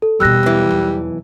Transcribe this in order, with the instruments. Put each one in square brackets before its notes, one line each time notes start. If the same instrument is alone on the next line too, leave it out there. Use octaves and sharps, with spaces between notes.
[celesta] A4
[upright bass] E2 B2 [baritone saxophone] G3 [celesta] E6 F#6 A#6
[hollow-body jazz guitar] B1 E3
[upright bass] E2